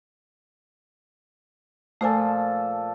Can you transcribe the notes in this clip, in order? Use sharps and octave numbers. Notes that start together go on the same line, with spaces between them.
A#2 F3 A3 A4 C5 G#5